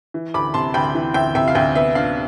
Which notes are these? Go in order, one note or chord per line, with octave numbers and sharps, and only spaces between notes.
E3
D2 B5 D6
C3 A5 C6
D2 G5 B5
E3
D2 E5 G5
C3 E5 G5
F5
D2 E5 G5
B3 E5
D4 F5